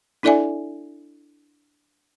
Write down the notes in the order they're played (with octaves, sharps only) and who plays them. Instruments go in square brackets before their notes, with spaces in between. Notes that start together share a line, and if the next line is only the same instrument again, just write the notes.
[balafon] D4 E4 A4 D5 E5 G#5